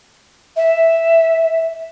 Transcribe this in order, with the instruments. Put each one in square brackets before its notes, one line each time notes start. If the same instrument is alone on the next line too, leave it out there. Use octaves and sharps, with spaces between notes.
[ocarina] E5